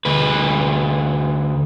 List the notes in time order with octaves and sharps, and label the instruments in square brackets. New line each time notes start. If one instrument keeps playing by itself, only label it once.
[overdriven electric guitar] D2 B4